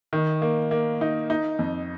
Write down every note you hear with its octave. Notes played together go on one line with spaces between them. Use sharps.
D#3
A#3
A#3
D#4
D#4
F2